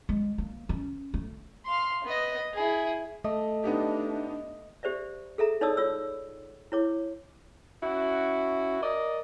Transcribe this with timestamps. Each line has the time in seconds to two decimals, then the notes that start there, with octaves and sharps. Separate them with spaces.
0.09 G#3
0.38 A#3
0.69 C#4
1.14 A3
1.66 F5 C6
2.04 B3 D#5
2.54 E4 G#4
3.24 A3 D#5
3.64 B3 D4 D#4 G4
4.83 G4 C5 D5 E5
5.38 G#4 A4 E5 A#5
5.61 D#4 C#5 D5 A5 D#6 E6
5.77 F4 C#5 E6
6.72 E4 C#5 D6
7.83 C#4 E4 F#4
8.82 A#4 D5 D#5